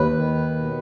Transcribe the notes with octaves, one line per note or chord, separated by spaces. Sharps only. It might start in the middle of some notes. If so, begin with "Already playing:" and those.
Already playing: D#2 B4
D#3
B2